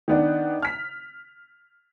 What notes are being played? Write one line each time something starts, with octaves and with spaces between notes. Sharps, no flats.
D#3 B3 D4
F6 B6